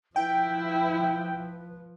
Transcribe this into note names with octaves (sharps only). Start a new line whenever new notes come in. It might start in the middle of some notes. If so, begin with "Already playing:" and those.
F3 E4 B4 G5